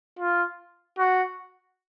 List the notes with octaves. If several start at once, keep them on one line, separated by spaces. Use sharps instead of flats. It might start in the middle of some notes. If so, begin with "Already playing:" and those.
F4
F#4